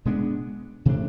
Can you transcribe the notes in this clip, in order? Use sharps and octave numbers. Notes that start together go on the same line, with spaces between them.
B2 G#3 B3 D4
C3 E3 A3 D4